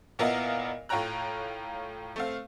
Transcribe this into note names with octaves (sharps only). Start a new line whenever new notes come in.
A#2 B3 E4 A#4 D#5 F5
A2 F4 C#5 G5 A#5 F#6
A3 C4 F5